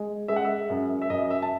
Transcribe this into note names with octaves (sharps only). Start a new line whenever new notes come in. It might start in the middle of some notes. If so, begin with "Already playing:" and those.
Already playing: G#3
G#3 E5
F#5
E5
F#2
E5
F#2 D#5
E5
A5